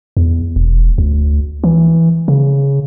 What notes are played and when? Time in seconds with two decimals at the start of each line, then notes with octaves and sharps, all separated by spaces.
0.17 E2
0.56 E1
0.98 D2
1.64 E3
2.28 C#3